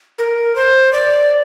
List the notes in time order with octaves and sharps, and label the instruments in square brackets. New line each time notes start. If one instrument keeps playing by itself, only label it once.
[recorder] A#4
C5
D5